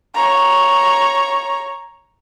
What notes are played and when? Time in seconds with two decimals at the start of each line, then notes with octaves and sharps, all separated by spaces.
0.15 C#5 A#5